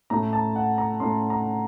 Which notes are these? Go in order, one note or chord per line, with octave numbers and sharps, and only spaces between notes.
A2 A3 C#4 A#5
A5
F#5
A#5
A2 A3 C#4 C6
A#5